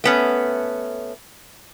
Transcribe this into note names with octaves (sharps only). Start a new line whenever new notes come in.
A3 B3 C#4